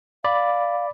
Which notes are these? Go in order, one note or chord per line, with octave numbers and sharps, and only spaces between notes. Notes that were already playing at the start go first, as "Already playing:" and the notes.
D5 F5 B5